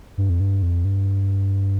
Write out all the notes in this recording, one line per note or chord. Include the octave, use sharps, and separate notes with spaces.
G2
F2
G2
F2
G2